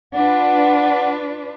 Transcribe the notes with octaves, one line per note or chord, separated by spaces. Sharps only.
D4 F4 B4 F#5